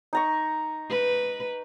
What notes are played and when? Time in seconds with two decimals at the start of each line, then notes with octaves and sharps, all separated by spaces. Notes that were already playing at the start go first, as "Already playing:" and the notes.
0.13 D#4 A#5 C#6
0.90 B4